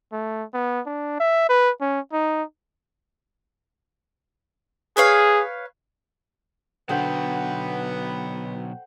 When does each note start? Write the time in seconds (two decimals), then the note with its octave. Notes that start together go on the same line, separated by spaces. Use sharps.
0.13 A3
0.54 B3
0.86 D4
1.20 E5
1.49 B4
1.81 C#4
2.12 D#4
4.97 G#4 B4 C#5 F5
6.89 B2 D3 F#3 B3 C5 F#5 G5